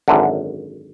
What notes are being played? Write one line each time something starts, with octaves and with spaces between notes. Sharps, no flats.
G#1 F#2 D3